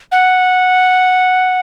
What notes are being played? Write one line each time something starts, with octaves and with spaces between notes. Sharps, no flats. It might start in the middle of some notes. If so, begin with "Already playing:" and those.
F#5